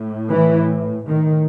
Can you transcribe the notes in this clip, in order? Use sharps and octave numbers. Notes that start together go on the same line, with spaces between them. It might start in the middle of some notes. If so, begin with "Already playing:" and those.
Already playing: A2
E3
A2 D#3